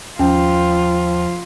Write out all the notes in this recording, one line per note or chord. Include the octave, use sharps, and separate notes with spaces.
D#2 F3 C#4 F4 G5